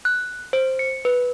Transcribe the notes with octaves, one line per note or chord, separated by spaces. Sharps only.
F#6
C5
C#7
B4